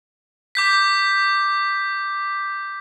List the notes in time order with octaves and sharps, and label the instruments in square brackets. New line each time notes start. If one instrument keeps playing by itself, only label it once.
[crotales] D6 G6 B6